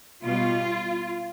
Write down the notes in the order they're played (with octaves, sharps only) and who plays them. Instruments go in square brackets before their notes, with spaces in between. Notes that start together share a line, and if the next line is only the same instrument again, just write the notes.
[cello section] B2 G3 F4